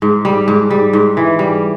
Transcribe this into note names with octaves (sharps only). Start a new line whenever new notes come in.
G#2
G3
G#2
G3
G#2
E3
G3